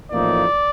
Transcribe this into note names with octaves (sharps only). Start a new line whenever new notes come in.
A1 A2 F3 A#3 D#4 D5